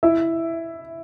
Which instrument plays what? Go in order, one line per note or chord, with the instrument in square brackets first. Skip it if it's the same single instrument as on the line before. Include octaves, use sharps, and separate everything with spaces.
[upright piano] E4 E5